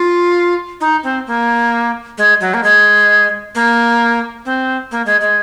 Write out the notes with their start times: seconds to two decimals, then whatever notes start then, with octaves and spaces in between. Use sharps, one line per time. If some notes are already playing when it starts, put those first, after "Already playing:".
Already playing: F4
0.81 D#4
1.03 C4
1.27 A#3
2.18 G#3
2.41 F#3
2.54 A#3
2.63 G#3
3.55 A#3
4.45 C4
4.91 A#3
5.06 G#3
5.21 G#3